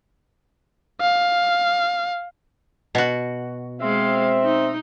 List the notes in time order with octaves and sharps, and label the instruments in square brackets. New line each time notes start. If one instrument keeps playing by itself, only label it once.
[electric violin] F5
[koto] B2 F#4
[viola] G#3 F5 [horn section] C4 E5
[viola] D#4